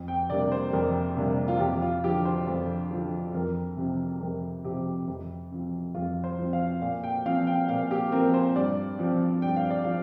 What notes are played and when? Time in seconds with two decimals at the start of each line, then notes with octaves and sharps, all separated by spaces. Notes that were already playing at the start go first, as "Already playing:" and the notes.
Already playing: F2
0.08 G5
0.30 C3 G3 A#3 D4 D5
0.52 C5
0.73 F2 A#4
1.17 C3 G3 A#3 D4
1.48 F4
1.60 F2 G4
1.82 F4
2.04 D3 F3 G4
2.25 C5
2.47 F2
2.91 D3 F3
3.34 F2 A#4
3.77 C3 F3 C4
4.21 F2 A#4
4.65 C3 F3 C4 G4
5.08 F2
5.51 F3 C4
5.95 F2 F4
6.24 C5
6.38 F3 C4
6.53 F5
6.82 A#2 F5
7.04 G5
7.25 F3 C4 F5
7.47 G5
7.69 A#2 F5
7.91 G4
8.12 F3 C4 A#4
8.34 C5
8.55 G2 D5
8.99 F3 C4
9.42 G2 G5
9.57 F5
9.70 D5
9.84 F3 F5